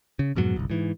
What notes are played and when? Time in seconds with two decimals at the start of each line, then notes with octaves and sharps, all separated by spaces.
0.19 C#3
0.36 F2 G#2 B2 F#3
0.56 G1 C2
0.70 G#2 E3